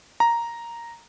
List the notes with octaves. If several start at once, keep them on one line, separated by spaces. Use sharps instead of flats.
A#5